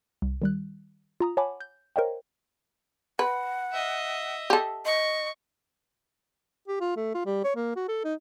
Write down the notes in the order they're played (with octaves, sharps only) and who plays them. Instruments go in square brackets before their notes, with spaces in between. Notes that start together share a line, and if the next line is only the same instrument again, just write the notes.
[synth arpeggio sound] C2
D#3 G3 F#6
F4 A#5 D#6
C#5 F#5 G#5 A5 B5 D6
G6
A#4 C5 C#5 D#5 F5 G5
[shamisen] B4 [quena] F#5
[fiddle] D#5 E5
[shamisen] G4 A4
[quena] D#5 [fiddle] C#6
[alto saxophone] G4
F4
A3
F4
G3
C#5
A#3
F#4
A4
D#4